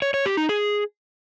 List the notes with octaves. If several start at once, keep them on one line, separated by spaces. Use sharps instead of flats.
C#5
C#5
G4
D#4
G#4